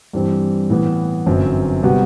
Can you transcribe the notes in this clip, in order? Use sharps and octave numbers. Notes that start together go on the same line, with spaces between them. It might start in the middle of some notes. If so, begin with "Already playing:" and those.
G2 E3 G3 C4
A2 E3 B3
G1 F#2 F#3 C4
C3 G3 B3 F#4